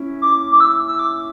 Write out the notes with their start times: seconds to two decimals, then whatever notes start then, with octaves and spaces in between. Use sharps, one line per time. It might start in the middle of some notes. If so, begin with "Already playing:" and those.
Already playing: C#4 E4
0.22 D6
0.52 D6
0.60 E6
0.88 E6
0.99 D6